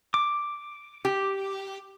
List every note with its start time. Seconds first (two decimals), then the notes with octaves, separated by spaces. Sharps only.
0.14 D6
1.05 G4